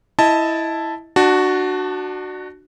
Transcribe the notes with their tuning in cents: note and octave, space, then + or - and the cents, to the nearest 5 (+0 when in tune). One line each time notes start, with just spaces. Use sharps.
E4 +0 D#5 +15 A5 +0
D4 +30 F#4 +0 A5 +0